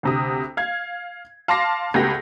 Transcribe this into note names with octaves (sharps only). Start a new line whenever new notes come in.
D2 C3 D#6
F5 G#6
F5 A5 C6 D6 A#6 C7
C#2 A3 B3 G4 A#6